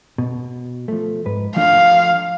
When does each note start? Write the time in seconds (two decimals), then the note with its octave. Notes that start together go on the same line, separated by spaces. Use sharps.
0.18 B2
0.88 F3 A3
1.26 G#2 B4
1.56 F3 A3 D4 F5